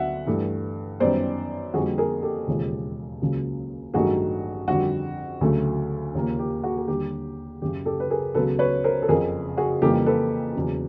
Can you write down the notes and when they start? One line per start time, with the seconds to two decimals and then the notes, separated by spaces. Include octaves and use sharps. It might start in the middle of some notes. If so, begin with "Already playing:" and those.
Already playing: D2 D3 F#3 B3 E5 F#5
0.27 G2 E3 A3
1.00 F#2 D#3 G3 B3 C5 D5
1.74 F2 D3 G3 A#3 F#4 G#4
1.98 G#4 A#4
2.22 G4 A4
2.47 E1 D#2 C#3 F3 G#3
3.20 C#2 C#3 F#3 A#3
3.94 A1 G2 D#3 F#3 A3 F#4 G#4
4.68 F2 D3 G3 F#4
5.41 D2 C#3 F#3 A3
6.15 D#2 C#3 F3 A#3
6.39 G4
6.63 F#4 G#4
6.77 G#4
6.88 D#2 D3 G3 G4
7.61 F#1 F#2 C#3 G4
7.85 G4 A4
8.00 B4
8.10 G#4 A#4
8.34 C#2 C#3 F#3 B3 A4 B4
8.59 B4 C#5
8.84 A#4 C5
9.02 A4
9.08 F#1 F2 C#3 G#4 A#4
9.57 F#4 G#4
9.81 F2 C#3 E3 G3 A#3 G4 A4
10.06 A4 B4
10.55 E2 C#3 F#3